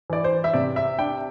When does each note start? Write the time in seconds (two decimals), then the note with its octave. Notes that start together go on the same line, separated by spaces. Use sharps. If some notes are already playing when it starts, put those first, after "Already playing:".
0.10 E3 D5
0.24 C5
0.44 E5
0.53 C3 D5
0.76 E5
0.99 D4 G5